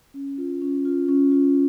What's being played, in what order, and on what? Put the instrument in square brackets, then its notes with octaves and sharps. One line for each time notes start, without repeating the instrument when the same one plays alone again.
[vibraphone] C#4
F4
C#4
F4
C#4
F4